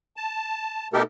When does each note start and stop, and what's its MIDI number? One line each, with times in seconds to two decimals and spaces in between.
0.17 0.87 81
0.93 1.02 47
0.93 1.02 57
0.93 1.02 63
0.93 1.02 67
0.93 1.02 69
0.93 1.02 70